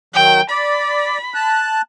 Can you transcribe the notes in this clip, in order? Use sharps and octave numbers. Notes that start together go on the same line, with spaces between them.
D#3 F#3 G5
D5 B5
A5 F#6